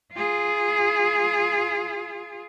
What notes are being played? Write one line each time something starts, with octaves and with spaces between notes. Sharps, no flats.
F4 G#4